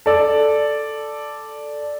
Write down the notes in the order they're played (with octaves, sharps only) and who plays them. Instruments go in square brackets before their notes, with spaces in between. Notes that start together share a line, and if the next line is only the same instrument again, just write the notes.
[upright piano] A4 D5